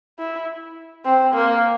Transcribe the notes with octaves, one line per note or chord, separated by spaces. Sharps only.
E4
C4
A#3